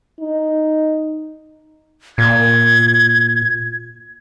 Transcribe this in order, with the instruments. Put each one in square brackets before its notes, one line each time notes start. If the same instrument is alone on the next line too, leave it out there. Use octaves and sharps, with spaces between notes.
[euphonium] D#4
[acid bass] A#2 [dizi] G#6